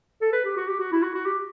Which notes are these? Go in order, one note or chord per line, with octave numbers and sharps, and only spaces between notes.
A4
B4
G4
F#4
G4
F#4
E4
F#4
F#4
G4